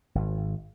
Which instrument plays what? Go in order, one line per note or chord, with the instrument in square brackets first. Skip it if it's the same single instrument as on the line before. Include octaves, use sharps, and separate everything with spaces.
[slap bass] G#1